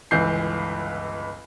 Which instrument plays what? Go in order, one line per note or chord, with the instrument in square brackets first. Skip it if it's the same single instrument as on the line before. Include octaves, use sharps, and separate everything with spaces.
[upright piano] G1 C#2 E3 G6 C7